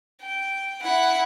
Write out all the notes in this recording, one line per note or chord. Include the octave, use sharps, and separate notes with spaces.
G5
E4 F#5